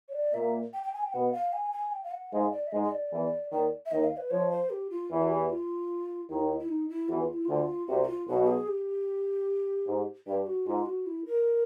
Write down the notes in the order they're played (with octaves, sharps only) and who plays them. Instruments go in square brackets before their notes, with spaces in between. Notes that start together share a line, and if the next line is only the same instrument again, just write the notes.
[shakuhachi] C#5
D5
[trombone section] A#2 A#3 [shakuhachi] E5
[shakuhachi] G5
G5
G#5
G5
[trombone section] B2 B3 [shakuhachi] F#5
[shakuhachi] F5
G#5
G#5
G5
F5
F#5
[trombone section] G#2 G#3 [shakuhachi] F5
[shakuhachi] D5
E5
[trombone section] G#2 G#3 [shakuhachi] D#5
[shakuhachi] D#5
D5
[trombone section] E2 E3
[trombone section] D#2 D#3 [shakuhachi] D5
[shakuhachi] E5
[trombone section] D#2 D#3 [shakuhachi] D#5
[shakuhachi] F5
B4
[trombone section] F2 F3 [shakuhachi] C#5
[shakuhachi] C5
G4
F4
[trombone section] E2 E3
[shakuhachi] F#4
G4
F4
[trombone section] D#2 D#3 [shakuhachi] E4
[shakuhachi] D#4
E4
E4
D#4
E4
[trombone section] E2 E3 [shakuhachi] F#4
[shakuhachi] F4
E4
[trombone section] D2 D3 [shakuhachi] F4
[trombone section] C2 C3 [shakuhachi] F#4
[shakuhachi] F#4
F4
[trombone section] B1 B2 [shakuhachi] F#4
[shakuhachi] G#4
G4
[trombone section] G#2
[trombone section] G2 [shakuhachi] G4
[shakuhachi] F#4
[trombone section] G#2 [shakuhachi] F4
[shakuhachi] F#4
E4
A#4